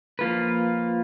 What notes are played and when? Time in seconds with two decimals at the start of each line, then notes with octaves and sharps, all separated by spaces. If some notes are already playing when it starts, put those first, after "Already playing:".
0.19 F3 A#3 F4 B4